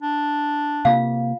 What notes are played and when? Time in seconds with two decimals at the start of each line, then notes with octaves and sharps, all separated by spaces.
0.02 D4
0.85 C3 A#3 F4 F5